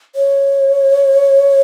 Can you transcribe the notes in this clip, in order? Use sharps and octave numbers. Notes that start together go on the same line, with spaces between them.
C#5